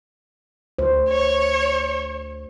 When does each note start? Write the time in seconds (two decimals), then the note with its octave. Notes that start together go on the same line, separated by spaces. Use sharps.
0.78 D2 C5
1.09 C#5